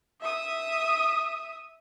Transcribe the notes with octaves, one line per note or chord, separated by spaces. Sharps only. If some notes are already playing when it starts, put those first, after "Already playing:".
E5 D#6